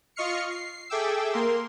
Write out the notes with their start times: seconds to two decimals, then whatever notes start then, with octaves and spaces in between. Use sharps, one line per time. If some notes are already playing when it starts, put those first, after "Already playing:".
0.16 F4 D#5 C#6 F6 C7 C#7
0.50 C7
0.90 G#4 A4 E5 G5 D6 E6
1.33 A#3 A#4 C6